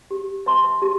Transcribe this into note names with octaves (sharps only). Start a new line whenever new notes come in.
G4
B4 E5 A5 C6
G4